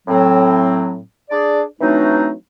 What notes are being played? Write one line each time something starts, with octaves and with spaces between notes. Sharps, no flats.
A2 F#3 C4
D4 G#4 D5
E3 F#3 A3 C4 D4 D#4